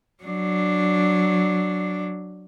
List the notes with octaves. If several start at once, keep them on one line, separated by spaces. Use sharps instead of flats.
F#3 D4